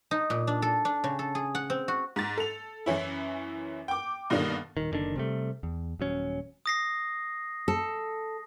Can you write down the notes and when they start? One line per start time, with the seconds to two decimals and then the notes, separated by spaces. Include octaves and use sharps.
0.11 D#4
0.30 A#2
0.47 D4
0.62 A4
0.85 D4
1.04 C#3
1.19 A4
1.35 G#4
1.55 F#5
1.70 C4
1.88 F#4
2.16 G#2 A6
2.37 A4 F7
2.86 F#2 E3 C#4 E4
3.88 G5 D6
4.30 G2 B2 D3 D#3 A#3 D4
4.77 D#1 D#3
4.91 F#1 D3 D#3 D4
5.16 C3 G3 A3
5.63 E2
6.00 D#1 F#3 C#4
6.66 D#6 A#6 C7
7.68 A4